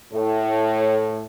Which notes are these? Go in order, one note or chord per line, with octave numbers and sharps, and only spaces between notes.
A2